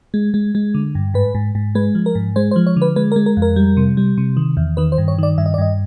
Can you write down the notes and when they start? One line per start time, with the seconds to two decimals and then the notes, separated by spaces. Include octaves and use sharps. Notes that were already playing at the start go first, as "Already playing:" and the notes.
0.14 G#3
0.34 G#3
0.55 G#3
0.74 D3
0.95 G2
1.14 G#2 B4
1.35 G#2
1.55 G#2
1.75 G#3 B4
1.95 F3
2.06 A#4
2.15 G#2
2.36 G#3 C5
2.51 C5
2.56 F3
2.67 C#5
2.77 D3
2.82 B4
2.96 G#3 B4
3.12 A#4
3.16 G#3
3.26 A#4
3.37 F2
3.42 A#4
3.56 G3
3.77 C3
3.97 G3
4.18 C3
4.37 D#3
4.57 E2
4.77 D#3 B4
4.92 C5
4.98 G2
5.08 C#5
5.18 D#3 D5
5.38 G2 E5
5.46 D#5
5.54 D5
5.58 G2 D#5